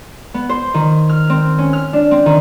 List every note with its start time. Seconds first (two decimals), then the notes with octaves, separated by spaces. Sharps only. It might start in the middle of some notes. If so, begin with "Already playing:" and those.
0.34 B3
0.49 C5
0.74 D#3
1.09 F6
1.30 C4
1.58 C#4
1.73 F6
1.93 D4
2.11 C4
2.26 D#3